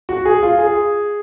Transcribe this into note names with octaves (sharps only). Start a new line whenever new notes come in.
F#4
G#4
F4
G#4